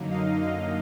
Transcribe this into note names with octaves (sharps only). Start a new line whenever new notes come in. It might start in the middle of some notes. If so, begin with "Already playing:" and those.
Already playing: F#2 D3 F#3 A#3 D#4
D#5 F5
D#5 F5